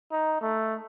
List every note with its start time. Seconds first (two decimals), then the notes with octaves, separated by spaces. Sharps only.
0.12 D#4
0.41 A3